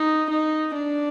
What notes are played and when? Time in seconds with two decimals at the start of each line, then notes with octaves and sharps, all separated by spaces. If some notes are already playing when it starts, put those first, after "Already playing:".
Already playing: D#4
0.29 D#4
0.73 D4